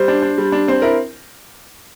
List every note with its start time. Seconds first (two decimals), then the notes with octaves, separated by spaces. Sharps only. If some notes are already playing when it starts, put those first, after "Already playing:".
Already playing: G3 C5
0.08 D4
0.22 D4
0.38 G3
0.52 D4
0.68 C4 C5
0.82 E4 A#4